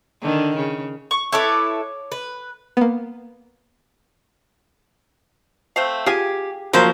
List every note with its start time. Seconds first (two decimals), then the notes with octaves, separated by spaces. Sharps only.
0.22 D3 D#3
0.57 C#3
1.11 C#6
1.33 E4 A4 B4 C#5 C#6 D6
2.12 B4
2.77 A#3 B3
5.76 A3 C4 F5
6.06 F4 G4 G#4 G#5
6.73 F3 F#3 A#3 A#4 C5